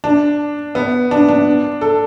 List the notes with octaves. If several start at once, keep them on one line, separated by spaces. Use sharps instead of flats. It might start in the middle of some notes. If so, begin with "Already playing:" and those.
D4
B3
D4
D4
A4